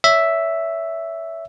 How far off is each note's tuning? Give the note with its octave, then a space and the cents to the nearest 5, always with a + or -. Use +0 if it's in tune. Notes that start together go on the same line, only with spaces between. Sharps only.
C#5 +25 E5 +0